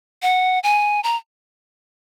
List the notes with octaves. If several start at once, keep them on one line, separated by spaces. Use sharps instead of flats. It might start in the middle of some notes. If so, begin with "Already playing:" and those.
F#5
G#5
A#5